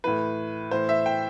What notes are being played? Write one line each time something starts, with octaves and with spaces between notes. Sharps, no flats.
A2 E3 B4
A2 E3 C5
E5
G5